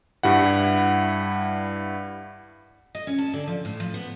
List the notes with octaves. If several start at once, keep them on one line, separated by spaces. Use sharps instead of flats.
G2 G3 E4 F#5
D#5
C#4
A5
D3
F3
A2
F3
B3